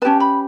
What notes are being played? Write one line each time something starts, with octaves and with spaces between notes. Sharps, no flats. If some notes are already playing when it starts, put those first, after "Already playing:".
C#4 G4 B4 A5
B5